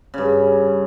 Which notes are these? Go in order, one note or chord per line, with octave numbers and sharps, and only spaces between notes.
G2 C#3